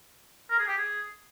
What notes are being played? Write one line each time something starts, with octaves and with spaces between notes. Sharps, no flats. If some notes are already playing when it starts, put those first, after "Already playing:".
A#4
G#4
G4
G#4